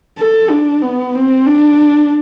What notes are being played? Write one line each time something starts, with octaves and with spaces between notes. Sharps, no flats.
A4
D4
B3
C4
D4